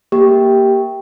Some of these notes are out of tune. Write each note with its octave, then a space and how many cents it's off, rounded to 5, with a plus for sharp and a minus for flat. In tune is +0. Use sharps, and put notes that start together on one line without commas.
A#3 +0 G4 +0